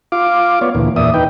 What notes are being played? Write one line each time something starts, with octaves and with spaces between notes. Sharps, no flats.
F4 F5 D6
B3 C#5 D5
D2 A#2 E3
E2 A#2 D5 E5 D#6
D#4 B4 G5